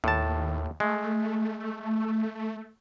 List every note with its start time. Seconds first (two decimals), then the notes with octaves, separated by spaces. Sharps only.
0.04 D#2 A2 A5
0.80 G#3 A3